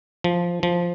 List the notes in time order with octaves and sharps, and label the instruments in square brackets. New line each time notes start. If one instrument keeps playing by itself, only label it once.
[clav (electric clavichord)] F3
F3